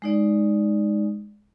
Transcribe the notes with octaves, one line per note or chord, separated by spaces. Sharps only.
G#3 D#4 D5